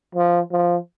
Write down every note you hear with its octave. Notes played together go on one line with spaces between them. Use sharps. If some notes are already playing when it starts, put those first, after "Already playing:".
F3
F3